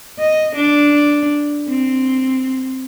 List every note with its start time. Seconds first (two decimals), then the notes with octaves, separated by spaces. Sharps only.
0.19 D#5
0.56 D4
1.68 C4